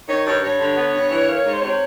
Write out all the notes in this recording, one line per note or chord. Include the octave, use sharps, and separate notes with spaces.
D#3 C#5
G2 C#5
G2 C#5
D3
B3
G2
E3
A#3
G#2
C5
C3 C#5